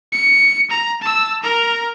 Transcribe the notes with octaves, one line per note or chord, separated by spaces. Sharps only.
C#7
A#5
A5 E6
A#4 A#5